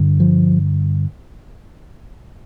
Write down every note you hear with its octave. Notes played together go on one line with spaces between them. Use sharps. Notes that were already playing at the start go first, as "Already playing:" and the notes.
Already playing: G2 D3
F3